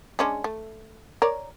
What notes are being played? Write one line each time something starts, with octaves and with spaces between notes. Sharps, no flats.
G#3 C#4 D4
A3
A#4 C#5 D5